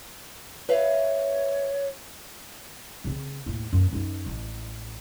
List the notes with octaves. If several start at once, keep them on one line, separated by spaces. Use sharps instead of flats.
B4 C#5 E5 F5
C#3 C4
D#2 A2
F#2 A#3
F#2 D#4
A1